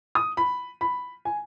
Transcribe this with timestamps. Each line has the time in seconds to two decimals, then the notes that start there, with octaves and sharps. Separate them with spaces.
0.15 D#6
0.37 B5
0.81 B5
1.25 G#5